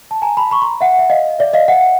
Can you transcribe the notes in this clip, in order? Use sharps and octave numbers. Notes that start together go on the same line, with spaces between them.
A5
G#5 A#5
A5 B5
B5 C#6
A#5 C6
E5 F#5
E5
D#5 F5
D5 E5
D#5 F5
E5 F#5